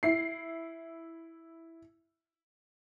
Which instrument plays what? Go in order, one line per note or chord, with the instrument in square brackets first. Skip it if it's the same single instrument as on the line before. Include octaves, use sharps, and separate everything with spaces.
[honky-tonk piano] E4 C7